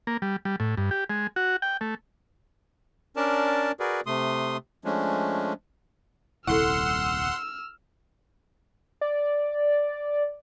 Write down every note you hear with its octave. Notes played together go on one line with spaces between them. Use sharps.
A#3
G3
G3
A2
G2
G4
G#3
F#4
G5
A3
C#4 D4 A#4 D5 A5
F#4 G#4 A#4 B4 D5
C3 A3 C6 D#6
F3 G#3 A3 C#4 D4
D#1 C2 E4 A4 F#5 C6 E6 F6
D5